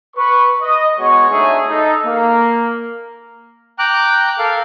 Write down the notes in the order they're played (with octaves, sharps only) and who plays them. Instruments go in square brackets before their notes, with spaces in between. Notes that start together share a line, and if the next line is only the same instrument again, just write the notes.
[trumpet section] B4 C#6
D#5
G#3 B3 F#4 C#5 C#6
A3 D4 D#4 G#4 C#5 E5
D#4 A4
A#3
[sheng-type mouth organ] G5 A#5 D6 F#6
A4 A#4 F5